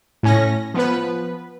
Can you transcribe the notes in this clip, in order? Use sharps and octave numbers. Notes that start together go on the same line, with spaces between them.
A2 C#4 A#6
F3 B3 B4